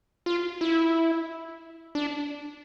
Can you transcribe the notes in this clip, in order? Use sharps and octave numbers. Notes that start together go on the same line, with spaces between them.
F4
E4
D4